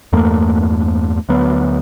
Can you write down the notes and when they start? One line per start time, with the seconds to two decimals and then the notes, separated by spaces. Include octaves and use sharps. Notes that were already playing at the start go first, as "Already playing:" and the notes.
0.13 E2 G2 A3 A#3
1.29 D2 F#3 B3